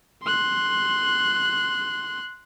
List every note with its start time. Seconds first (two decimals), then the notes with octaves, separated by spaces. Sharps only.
0.23 C6 F#6